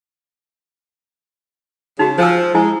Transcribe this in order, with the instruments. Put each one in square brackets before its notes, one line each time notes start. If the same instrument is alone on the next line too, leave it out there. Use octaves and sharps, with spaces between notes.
[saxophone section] C#3 [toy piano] D#4 F#4
[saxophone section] F3 [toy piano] C5 G#5 E6
[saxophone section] G#3 [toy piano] E4 G#5